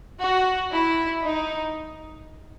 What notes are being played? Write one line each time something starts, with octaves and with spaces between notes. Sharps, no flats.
F#4
E4
D#4